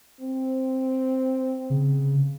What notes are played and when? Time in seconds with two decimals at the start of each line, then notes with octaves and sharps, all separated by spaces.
0.21 C4
1.70 C#3